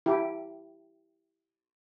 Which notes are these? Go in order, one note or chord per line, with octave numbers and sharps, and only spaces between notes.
E4 G4